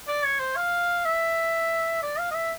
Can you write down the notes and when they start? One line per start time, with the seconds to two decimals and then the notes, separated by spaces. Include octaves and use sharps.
0.08 D5
0.24 C#5
0.40 C5
0.56 F5
1.05 E5
2.03 D5
2.19 F5
2.31 D#5
2.35 E5